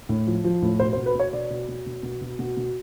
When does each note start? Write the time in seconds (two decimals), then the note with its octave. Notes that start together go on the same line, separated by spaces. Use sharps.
0.09 A2
0.27 F3
0.44 F3
0.62 A2
0.80 B2 C5
0.93 C5
0.97 B2
1.06 B4
1.15 B2 C#5
1.32 B2 D5
1.50 B2
1.68 B2
1.86 B2
2.03 B2
2.21 B2
2.39 B2
2.57 B2